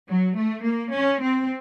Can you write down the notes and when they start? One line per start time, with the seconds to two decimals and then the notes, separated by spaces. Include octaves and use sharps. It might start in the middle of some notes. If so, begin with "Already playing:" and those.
0.09 F#3
0.37 A3
0.66 A#3
0.94 C#4
1.22 C4